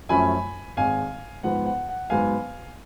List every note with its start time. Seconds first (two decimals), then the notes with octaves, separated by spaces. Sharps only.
0.09 F#2 F3 A3 C#4 G#5 B5
0.77 G#1 G#2 G#3 F5 G#5
1.43 G#2 F3 B3 F#5
1.66 F#5
1.89 F#5
2.10 G#2 F#3 B3 F5 G#5